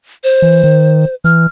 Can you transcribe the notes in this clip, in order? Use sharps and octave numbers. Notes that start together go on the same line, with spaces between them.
C5
E3
D#3
E3 F6